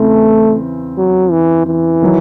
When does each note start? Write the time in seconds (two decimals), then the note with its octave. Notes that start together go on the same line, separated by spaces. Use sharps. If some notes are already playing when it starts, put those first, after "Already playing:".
Already playing: E2 C#3 A3 C4
0.97 F#3
1.31 E3
1.67 E3
2.02 D#3 F#3